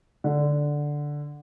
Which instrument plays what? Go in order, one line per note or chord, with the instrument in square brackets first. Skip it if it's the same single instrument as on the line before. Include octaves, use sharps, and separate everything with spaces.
[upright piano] D3